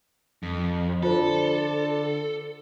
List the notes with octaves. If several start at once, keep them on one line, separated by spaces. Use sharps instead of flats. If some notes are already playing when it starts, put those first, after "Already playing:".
F2
D3 F4 A4 C5